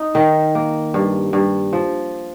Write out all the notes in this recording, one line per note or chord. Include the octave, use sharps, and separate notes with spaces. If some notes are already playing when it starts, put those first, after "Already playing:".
Already playing: D#4
D#3
A#3
G2
G2
F3